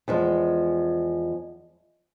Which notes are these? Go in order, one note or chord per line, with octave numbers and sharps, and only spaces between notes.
E2 F3 G#3